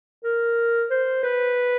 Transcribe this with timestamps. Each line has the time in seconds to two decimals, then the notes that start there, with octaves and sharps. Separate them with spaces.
0.24 A#4
0.90 C5
1.24 B4